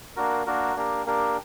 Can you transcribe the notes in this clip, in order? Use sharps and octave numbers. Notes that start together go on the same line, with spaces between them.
A#3 D4 F#4 A#4
A#3 D4 F#4 A#4
A#3 D4 G4 A#4
A#3 D4 G4 A#4